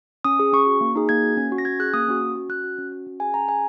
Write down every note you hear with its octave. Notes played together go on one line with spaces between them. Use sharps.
C#4 D#6
G#4
C#4 C#6
F#4
A#3
D#4 G#4
A#3 G#6
F#4
C#4
F#4
A#6
C#4 G#6
G#4 F#6
A#3 D#6
C#4 F#4
C#4
F#4
C#4 F#6
F#4
C#4
F#4
C#4
G#4 G#5
C#4 A#5
G#4 G#5